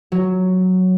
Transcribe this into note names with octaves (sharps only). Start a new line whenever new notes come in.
F#3